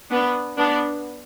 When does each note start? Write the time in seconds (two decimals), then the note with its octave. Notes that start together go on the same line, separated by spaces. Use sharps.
0.10 B3 D4
0.57 B3 D4